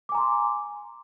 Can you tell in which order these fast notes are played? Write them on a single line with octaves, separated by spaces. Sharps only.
D6 G#5 A#5 C6